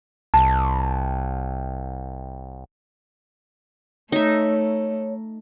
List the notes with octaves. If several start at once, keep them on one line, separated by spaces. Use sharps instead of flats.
C2 A5
A3 D#4 C#5 E5